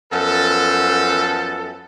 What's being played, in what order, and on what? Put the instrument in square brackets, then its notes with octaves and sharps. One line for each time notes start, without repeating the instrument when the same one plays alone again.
[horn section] F#2 F3 B3 A4